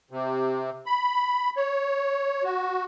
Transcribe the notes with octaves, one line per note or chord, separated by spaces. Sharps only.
C3
B5
C#5
F#4